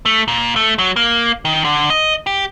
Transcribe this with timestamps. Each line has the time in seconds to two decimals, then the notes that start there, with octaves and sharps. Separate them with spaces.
0.05 A3
0.28 A#2
0.56 A3
0.78 F#3
0.96 A#3
1.45 D#3
1.64 D3
1.90 D#5
2.27 G4